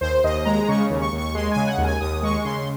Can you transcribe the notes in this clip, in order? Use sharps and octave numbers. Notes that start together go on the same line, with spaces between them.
D#2 C5
D#2 D#5
G#3 A#5
C#3 C#6
D#2
C#6
D#2
C#6
G#3 C6
C#3 G#5
F#5
D#2
G#5
D#2 D#6
G#3 C#6
C#3 C6